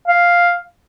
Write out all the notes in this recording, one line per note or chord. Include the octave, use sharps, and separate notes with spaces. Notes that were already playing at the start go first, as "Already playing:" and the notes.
F5